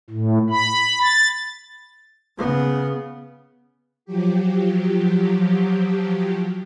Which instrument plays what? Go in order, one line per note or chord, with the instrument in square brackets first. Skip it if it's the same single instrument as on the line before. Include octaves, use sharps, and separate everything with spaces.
[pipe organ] A2
B5
A6
[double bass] C#3 B3
[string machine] F3 F#3 G4